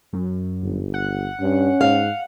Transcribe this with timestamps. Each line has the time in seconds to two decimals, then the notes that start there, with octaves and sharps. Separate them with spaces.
0.13 F#2
0.63 G1
0.94 F#5
1.41 G2 C#4
1.81 G#2 F5